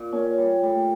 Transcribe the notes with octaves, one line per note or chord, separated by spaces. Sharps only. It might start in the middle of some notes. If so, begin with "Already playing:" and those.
Already playing: A#2
A#3 C#4
G3
G3 A3